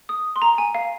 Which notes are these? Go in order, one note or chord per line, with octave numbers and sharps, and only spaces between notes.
D#6
C6
A#5
G#5
F5